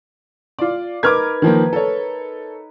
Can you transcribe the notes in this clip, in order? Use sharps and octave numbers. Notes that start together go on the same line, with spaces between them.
F4 D5
D#4 A#4 B4 D6 F6 G#6
D#3 F3 A#3
A4 C#5